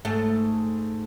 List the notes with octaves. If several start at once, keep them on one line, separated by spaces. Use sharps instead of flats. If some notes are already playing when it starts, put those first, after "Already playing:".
G#2 A3